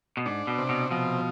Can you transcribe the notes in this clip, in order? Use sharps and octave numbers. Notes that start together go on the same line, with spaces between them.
B2
G#2 D4
B2
C3
B2
B2 F3